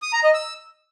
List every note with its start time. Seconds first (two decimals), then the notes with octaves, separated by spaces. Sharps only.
0.02 D#6
0.13 A#5
0.23 D#5
0.34 E6